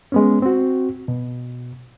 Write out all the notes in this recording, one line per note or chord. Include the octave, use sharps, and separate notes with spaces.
G#3 B3 C#4
C4 F#4
B2